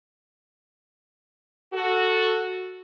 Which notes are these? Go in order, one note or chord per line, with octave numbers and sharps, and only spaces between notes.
F#4 A4